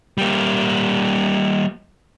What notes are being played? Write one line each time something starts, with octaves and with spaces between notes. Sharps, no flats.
G3 A#3